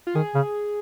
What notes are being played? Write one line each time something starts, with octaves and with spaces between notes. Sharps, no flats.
F4
D#3 G#4
C#3